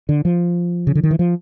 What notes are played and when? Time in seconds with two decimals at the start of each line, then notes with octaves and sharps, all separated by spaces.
0.09 D3
0.25 F3
0.87 C#3
0.95 D3
1.03 D#3
1.11 E3
1.19 F3